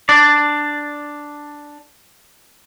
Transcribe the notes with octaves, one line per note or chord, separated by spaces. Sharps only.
D4 D5